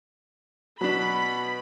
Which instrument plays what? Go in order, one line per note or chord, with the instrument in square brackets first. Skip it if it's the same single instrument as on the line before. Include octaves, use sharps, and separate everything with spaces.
[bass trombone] B2 [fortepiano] F#3 D4 [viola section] B5